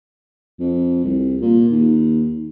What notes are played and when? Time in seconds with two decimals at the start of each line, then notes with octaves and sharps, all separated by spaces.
0.59 F2
1.04 C2
1.41 A#2
1.71 D#2